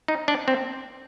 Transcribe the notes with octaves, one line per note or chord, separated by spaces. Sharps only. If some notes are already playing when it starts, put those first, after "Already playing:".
D#4
D4
C4